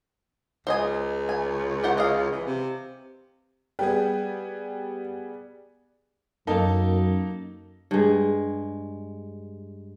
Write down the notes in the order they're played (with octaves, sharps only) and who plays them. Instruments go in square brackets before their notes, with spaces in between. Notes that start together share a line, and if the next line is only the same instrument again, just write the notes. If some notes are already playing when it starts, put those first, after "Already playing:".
[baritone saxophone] C#2 [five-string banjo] C5 D#5 G#5
[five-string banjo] G#5
G4 C5 F#5
D#5 F5
[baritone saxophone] E3
C3
[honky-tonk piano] G3 B3 G#4 [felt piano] G5
[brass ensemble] F#2 [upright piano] A#3 D#4 A4
[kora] G2 G#3